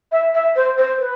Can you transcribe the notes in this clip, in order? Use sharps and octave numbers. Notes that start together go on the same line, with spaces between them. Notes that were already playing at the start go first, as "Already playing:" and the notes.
E5
E5
C5
C5
B4